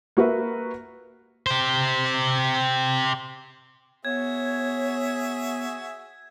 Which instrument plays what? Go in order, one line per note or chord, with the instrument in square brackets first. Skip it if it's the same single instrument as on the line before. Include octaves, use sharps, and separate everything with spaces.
[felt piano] A#3 F#4 B4 E5
[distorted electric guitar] G4 C5
[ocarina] B3 [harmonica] F#4 G#4 E5 [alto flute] C#5 [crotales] G#6